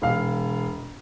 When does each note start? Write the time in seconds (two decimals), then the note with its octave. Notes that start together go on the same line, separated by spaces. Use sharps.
0.02 E1 F5